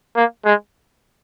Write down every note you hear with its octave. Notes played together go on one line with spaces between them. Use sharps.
A#3
G#3